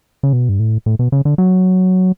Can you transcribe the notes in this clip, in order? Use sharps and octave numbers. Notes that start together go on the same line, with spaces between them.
C#3
B2
G2
A2
A2
B2
C#3
D3
F#3